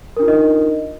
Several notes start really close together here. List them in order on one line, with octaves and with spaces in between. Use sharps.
A#4 D4 F4 D#4 D#5